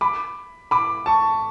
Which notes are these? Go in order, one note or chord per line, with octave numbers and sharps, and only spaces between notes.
B5 D6
B5 D6
A5 C#6